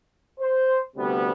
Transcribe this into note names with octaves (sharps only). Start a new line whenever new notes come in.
C5
D2 C3 G3 B3